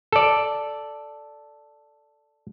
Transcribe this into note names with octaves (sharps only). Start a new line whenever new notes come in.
A4 D5